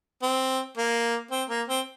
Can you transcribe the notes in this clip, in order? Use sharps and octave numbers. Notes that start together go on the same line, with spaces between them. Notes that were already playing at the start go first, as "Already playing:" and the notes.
C4
A#3
C4
A#3
C4